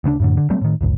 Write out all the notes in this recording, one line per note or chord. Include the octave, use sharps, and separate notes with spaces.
D2 C#3 C4 D4
F#2 A2 D3
D3
F#3 G3 A3 C4
A2 D#3
D1 G1 C#2